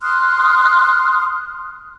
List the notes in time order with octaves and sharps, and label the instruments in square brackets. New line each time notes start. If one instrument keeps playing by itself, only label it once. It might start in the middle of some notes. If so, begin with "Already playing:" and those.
[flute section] C6 D#6 F6 F#6